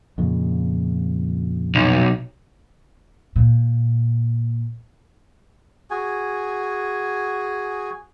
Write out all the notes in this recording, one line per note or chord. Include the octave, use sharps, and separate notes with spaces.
F2 A#2 C#3
B1
A#2
F#4 G#4 G#5